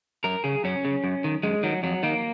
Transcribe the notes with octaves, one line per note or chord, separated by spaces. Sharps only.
F#2 A#4
C#3 G#4
F#2 C#4
C#3
F#2
D#3
F#2 G#3
D#3 F#3
F2 F#3
D#3 A#3